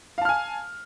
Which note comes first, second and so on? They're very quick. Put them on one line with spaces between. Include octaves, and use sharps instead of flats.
F5 A5 F6 G#5